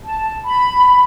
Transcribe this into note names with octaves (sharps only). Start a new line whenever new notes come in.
A5
B5